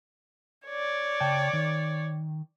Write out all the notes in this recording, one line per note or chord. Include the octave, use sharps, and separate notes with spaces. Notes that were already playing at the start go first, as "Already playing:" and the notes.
C#5 D5
C#3 G5 A5
D#3